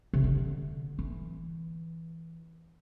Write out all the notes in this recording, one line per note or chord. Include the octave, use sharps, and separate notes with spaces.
C3
D3
E3